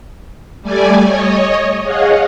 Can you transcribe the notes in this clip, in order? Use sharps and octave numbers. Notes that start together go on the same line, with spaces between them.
G3 A3 D5 G#5
C#5 D#5
G#4 C#5 D#5 F5 F#5